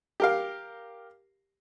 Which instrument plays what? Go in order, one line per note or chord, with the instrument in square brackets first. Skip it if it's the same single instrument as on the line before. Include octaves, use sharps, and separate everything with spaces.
[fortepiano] G4 A#4 F5